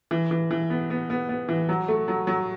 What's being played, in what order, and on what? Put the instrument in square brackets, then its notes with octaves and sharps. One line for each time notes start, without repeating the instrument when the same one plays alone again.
[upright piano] E3
E3
E3
B3
B3
B3
B3
E3
F#3
A3
F#3
F#3